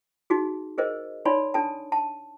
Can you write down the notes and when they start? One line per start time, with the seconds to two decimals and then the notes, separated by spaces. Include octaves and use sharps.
0.30 D#4 F#4 G#4
0.78 G#4 A#4 C5 D#5
1.25 D#4 C#5 D5 G#5 B5 C6
1.54 D4 A4 G#5 A5
1.92 A5